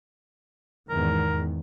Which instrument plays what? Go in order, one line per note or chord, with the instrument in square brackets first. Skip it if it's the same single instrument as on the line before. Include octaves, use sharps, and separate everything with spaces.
[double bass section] E2 G#2 D#3 [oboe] A#4